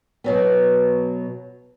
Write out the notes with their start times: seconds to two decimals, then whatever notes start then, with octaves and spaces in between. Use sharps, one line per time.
0.24 B2 F#3 B3